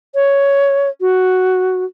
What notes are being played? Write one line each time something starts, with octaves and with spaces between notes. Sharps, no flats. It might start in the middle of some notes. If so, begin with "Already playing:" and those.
C#5
F#4